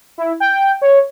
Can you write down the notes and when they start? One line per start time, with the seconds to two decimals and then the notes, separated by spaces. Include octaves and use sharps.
0.18 E4
0.40 G5
0.82 C#5